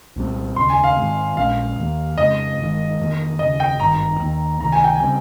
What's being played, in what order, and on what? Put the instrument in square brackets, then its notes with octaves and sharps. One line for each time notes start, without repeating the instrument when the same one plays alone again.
[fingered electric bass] C2 A#2 G3 C4
[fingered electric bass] F1 D#2 C#3 [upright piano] C6
[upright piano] G#5
F5
[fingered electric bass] G#2 D#3 G#3 C4
[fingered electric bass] A#1 A#2 G#3 C#4 [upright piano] F5
[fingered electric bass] D#2 D#3 A#3
[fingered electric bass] F2 C#3 G#3 C4 [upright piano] D#5
[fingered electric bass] G1 F2 D#3 G#3
F1 F2 D#3 A#3
[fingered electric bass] F1 D#2 C#3 [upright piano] D#5
[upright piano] G5
[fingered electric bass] G#1 G2 D#3 [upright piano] A#5
[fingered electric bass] D#2 D#3 A#3
[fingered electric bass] C#2 C3 D#3 [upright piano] A#5
[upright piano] G#5
G5
G#5
[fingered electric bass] C#3 G3 C4